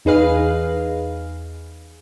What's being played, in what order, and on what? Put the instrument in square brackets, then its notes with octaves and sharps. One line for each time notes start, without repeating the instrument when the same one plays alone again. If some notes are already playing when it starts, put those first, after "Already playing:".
[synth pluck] E2 D#4 G#4 B4 F5